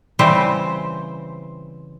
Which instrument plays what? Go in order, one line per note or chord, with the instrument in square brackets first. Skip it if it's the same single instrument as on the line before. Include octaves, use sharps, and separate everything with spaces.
[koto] C#3 E3 G3 C4 C5